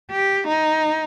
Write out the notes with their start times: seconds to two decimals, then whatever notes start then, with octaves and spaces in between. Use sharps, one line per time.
0.11 G4
0.48 D#4